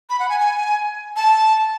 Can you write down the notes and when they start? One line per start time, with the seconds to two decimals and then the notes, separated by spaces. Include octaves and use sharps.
0.10 B5
0.20 F#5
0.29 G#5
0.40 G#5
1.16 A5